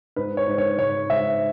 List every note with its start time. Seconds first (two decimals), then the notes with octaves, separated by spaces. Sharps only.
0.16 G#2 B4
0.37 C#5
0.48 G#2
0.58 C#5
0.79 G#2 C#5
1.10 G#2 E5